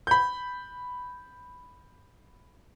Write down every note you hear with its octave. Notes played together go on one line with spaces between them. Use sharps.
B5 G6